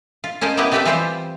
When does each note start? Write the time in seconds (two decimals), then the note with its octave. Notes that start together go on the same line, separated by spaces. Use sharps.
0.24 F4
0.41 C#4 A#4 C5 D#5 A5
0.57 A#3 B3 E4 G4 D#5
0.72 A3 C4 G4 B4 G5 A5
0.85 E3 G3 C4 F4 G4 C5